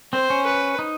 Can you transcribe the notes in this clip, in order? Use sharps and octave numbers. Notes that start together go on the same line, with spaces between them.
C4 C5
C#4
B4
D#4